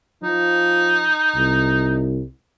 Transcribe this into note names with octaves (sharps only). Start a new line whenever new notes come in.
F3 D#4
C2